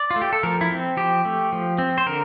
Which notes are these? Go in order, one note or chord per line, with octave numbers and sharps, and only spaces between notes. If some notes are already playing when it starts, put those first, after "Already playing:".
Already playing: D5
F4
A3
G4
A4
F3 A#4
E4
C4
F3 G4
A3
F3
C4
C5
D3 A#4